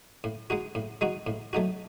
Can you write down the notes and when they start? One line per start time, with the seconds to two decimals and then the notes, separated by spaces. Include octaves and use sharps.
0.24 A2
0.50 G#3 D#4 F#4
0.75 A2
1.01 G#3 D#4 F#4
1.27 A2
1.53 F#3 A3 D#4 F#4